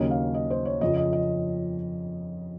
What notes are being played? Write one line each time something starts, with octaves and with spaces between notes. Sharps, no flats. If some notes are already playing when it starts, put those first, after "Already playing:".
Already playing: D#2 C#3 F#3 A#3 C#4 D#5
F5
D#5
C5
C#5
F2 C#3 F3 D#5
D#5
D#5